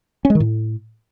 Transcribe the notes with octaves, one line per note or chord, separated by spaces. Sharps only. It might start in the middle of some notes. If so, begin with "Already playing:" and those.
C#4
G#3
D#3
A2